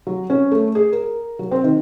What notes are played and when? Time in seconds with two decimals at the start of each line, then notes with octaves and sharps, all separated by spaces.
0.07 F#3
0.30 C#4
0.52 A3
0.75 G#4
0.92 A#4
1.39 F#3
1.51 C4
1.64 D#3